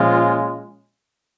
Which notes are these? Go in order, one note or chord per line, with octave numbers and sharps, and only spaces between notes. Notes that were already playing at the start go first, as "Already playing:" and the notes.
Already playing: A#2 F3 G#3 C#4 F4